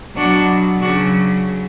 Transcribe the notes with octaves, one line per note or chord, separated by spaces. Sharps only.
B2 F#3 D4 F#4
C#3 F#3 D4 F#4